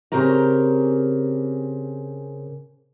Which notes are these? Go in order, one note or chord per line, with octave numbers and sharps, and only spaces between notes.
C#3 C4 G4 A#4 A#5